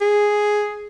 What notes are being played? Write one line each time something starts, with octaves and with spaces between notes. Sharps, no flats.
G#4